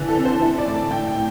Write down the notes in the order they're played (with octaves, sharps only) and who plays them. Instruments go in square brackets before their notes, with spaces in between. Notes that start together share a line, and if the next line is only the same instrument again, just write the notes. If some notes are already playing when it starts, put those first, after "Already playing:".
Already playing: [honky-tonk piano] D3 E3
A4
C4
C5
E4 A4
D5
A2
A5
A2 G5
G5
A2